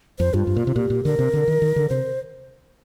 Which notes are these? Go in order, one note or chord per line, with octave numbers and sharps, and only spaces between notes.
F2 C5
G2 F4
G2
A#2
C3
A#2 G4
A#2
D3 A#4
C3
D3
D#3
D#3
D3
C3 C5